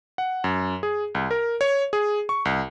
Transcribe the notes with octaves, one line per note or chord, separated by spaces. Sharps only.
F#5
F#2
G#4
C2
A#4
C#5
G#4
C#6
C2